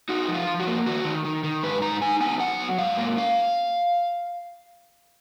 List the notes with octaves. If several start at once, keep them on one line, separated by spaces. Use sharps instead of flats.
D#4 F#4
F3
F4
F3
F#4
A#3
D#3 F#4
D#3
D#3
D#3
G#2 B4
D#4 A#5
D#4 G#5
B3 G#5
F#3 F#5
F#3
G#2 F5
A#3
C#4 F5